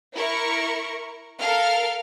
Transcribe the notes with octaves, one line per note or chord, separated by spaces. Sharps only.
E4 A#4 C#6
A4 A#4 F5 F6